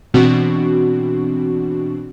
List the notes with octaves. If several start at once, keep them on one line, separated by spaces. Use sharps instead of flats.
B2 E3 C4 D4 F#4